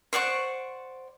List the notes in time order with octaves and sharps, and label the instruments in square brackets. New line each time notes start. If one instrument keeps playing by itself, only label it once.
[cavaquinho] C5 D5 F#5 C#6